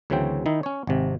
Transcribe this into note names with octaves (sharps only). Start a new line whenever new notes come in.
D2 C#3 E3 F#3 C4 G5
D#3 D#4 E4
C#4 C#5
G#1 C3